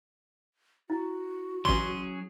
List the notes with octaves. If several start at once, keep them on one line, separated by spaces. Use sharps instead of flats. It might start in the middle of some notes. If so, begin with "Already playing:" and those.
E4 F#4
A1 F#3 C#4 G#4 C6